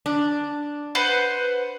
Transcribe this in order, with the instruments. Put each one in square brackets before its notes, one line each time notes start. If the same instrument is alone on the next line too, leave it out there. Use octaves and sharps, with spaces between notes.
[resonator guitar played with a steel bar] D4
[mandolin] B4 C5 F#5